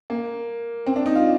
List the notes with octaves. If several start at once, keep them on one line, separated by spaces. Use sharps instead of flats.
A#3
C4
D4
D#4
F4